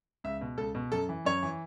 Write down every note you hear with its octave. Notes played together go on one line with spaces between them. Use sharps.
C#2 E5
B2
C#2 A4
B2
F#2 A4
E3
F#2 C#5
E3